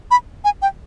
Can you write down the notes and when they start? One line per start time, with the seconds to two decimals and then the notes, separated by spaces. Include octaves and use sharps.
0.11 B5
0.44 G#5
0.62 G5